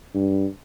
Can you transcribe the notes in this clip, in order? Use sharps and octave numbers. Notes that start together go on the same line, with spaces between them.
G2